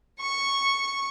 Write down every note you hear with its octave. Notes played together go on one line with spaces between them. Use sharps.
C#6